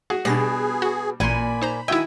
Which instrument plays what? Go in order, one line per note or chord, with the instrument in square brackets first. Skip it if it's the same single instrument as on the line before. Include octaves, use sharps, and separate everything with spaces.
[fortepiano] F#4 [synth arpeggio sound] G#4
[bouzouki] B2 [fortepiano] G3 D4 [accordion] G#4 [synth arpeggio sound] A6 A#6 C7
[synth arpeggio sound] F#4
[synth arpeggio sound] A1 C6 [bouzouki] A#2 G#5 [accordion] B5
[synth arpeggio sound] D#4 C5 A#5
[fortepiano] D#3 F#4 E5 [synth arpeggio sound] E4 G5 [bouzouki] G#5